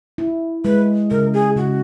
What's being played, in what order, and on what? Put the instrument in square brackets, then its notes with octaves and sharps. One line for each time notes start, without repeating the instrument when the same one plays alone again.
[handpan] E4
[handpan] G#3 [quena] B4
[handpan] C#3 [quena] A#4
[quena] G#4
[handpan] C#3 [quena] F#4